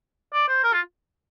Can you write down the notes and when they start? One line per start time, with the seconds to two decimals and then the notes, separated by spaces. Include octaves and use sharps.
0.34 D5
0.48 C5
0.64 A#4
0.73 F4